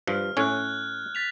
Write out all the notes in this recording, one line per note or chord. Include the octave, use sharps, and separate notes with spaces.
G2 F3 F6
A2 C#4 F#6 G#6
A6 B6 F7